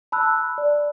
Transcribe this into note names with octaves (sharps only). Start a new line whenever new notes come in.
A5 B5 E6 F#6
D5